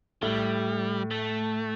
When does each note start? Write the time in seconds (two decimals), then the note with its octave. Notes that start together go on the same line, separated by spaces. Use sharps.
0.22 A2 G3
1.11 A3